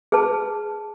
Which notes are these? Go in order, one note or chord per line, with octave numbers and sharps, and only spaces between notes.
G#4 B4 A5